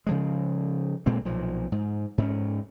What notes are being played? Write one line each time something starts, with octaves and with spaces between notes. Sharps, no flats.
C#3 F3 G#3
A#2 G#3 A#3 C4
B1 A#2 F3
G#2
G#2 C4 C#4